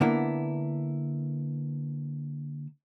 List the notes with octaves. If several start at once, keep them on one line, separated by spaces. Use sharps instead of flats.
D3 A#3 B3 E4